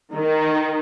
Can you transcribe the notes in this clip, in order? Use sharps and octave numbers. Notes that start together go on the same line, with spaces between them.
D#3